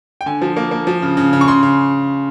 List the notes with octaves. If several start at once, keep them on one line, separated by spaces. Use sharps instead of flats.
G5
D3 G#5
F3
A#3
A#3
F3
C#3
C#3
C#3
C#6
C#3 C6
C#3